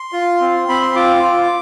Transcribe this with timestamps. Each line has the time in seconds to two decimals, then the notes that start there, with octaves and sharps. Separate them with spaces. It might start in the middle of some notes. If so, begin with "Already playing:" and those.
Already playing: C6
0.12 F4
0.40 C4
0.69 C4 B5
0.82 C6
0.95 F4 D6
1.24 F4